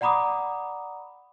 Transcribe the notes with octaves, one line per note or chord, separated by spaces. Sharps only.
D5 F#5 A#5 B5 D6 D#6